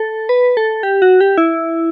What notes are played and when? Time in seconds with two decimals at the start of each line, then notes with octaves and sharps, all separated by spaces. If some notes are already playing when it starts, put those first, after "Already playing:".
Already playing: A4
0.29 B4
0.57 A4
0.83 G4
1.02 F#4
1.21 G4
1.38 E4